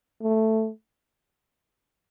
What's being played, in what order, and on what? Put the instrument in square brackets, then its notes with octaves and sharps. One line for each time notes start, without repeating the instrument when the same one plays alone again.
[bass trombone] A3